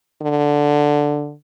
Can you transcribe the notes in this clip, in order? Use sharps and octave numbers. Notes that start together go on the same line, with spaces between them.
D3